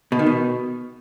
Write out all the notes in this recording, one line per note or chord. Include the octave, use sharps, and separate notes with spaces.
B2
D#3
B2